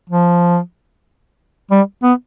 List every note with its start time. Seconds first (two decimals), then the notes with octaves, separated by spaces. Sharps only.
0.10 F3
1.71 G3
2.03 B3